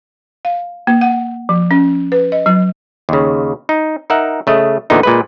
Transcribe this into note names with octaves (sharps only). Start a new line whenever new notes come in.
F5
A#3
F#5
F3
C#4
B4
D#5
F#3
D#2 C#3
D#4
D#4 A#4 E5 F#5
C#3 A3 D#5
E2 A#2 D3 B3 D#4
A#2 G#3 B4